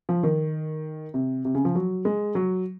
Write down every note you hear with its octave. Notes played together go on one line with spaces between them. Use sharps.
F3
D#3
C3
C3
C#3
F3
F#3
G#3
F#3